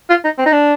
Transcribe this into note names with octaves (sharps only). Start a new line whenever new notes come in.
F4
D#4
C4
D#4
D4